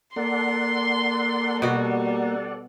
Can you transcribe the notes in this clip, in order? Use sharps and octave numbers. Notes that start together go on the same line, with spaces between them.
A#3 A4 D5 F#5 C6
B2 G3 F#4